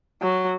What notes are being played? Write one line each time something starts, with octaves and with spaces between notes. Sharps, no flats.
F#3